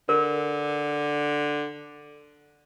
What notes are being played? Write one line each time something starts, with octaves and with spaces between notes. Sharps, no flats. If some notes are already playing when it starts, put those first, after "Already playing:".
D3 A#4